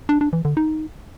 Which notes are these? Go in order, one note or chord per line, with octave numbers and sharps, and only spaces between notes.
D4
D4
E3
D3
D#4